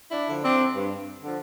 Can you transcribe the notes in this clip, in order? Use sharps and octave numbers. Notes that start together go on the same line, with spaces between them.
D4 E4
D3 F3
C4 D4
G2
D3 F3